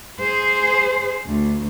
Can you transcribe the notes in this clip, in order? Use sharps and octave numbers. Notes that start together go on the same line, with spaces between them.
G#4 C5
D2